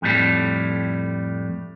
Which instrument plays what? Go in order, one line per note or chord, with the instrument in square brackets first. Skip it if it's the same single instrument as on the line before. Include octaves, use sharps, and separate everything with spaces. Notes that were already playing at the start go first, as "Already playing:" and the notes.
[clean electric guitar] F2 A2 G3